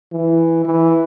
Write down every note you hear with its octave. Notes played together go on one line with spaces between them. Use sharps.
E3
E3